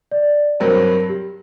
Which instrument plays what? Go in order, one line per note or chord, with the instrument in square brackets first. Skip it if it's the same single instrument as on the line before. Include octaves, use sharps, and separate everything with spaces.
[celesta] D5
[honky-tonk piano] G2 F#3 C4 [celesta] A#4
[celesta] G4